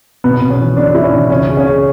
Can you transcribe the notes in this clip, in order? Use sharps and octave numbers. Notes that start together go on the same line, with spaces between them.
B1 B3
B1 B3
C#4
E3
B1 D4
B1 E4
C#4
E3 D4
C#2 C#4
C#3
C#4
C#3